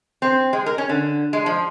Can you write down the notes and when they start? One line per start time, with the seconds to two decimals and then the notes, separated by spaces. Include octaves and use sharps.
0.22 C4
0.53 G#3
0.66 A#4
0.78 C#4
0.89 D3
1.33 G#3
1.46 F3